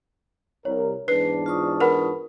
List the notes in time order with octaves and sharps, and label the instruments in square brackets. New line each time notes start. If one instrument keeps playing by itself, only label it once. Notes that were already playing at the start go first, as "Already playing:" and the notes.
[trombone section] C2 A#4 [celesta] C#5
[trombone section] E2 G#2 D4 [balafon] B4 [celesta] C7
[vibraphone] F4 C#6 D#6
[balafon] A#4 [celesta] B4 F#5 B5